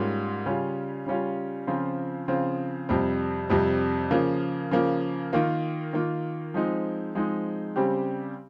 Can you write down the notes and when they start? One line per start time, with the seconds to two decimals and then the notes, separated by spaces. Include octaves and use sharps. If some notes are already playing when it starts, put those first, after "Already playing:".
Already playing: G#2 G3 A#3 C#4 F4
0.46 C#3 G3 C#4 F4
1.06 C#3 G3 C#4 F4
1.67 C#3 F3 C4 F4
2.28 C#3 F3 C4 F4
2.89 F2 C3 G3
3.50 F2 C3 G3
4.11 C#3 F3 A#3
4.71 C#3 F3 A#3
5.33 D#3 A#3 F4
5.93 D#3 A#3 F4
6.54 F3 G#3 C4 D#4
7.15 F3 G#3 C4 D#4
7.76 C#3 G3 C4 G4